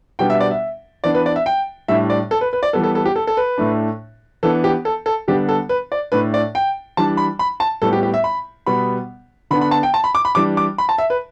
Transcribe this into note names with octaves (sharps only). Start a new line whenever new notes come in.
B2 G3 B3 D4 G5
E5
D5
E5
E3 B3 D4 D5
B4
D5
E5
G5
A2 G3 D4 E5
D5
A4
B4
B4
D5
E3 G3 B3 A4
A4
A4
G4
A4
A4
B4
A2 A3 D4
E3 B3 D4 A4
G4
A4
A4
D3 G3 B3 D4 G4
A4
B4
D5
A2 A3 D4 B4
D5
G5
E3 G3 D4 A5
B5
B5
A5
A2 G3 B3 A4
G4
G4
E5
B5
B2 G3 B3 B5
D3 B3 D4 B5
B5
A5
G5
A5
B5
D6
B5
E3 G3 D4 D6
D6
B5
A5
E5
B4